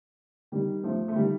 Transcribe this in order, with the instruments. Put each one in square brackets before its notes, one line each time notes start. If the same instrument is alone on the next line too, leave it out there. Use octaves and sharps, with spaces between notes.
[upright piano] D#3 G3
F3 A3
A3
D#3 G3